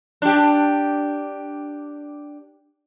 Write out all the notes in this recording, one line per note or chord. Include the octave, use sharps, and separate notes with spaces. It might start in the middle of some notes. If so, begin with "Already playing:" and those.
D4 G4